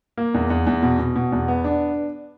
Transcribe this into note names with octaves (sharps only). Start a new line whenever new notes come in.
A#3
E2
E2
E2
B2
B2
B2
E2
B3
D4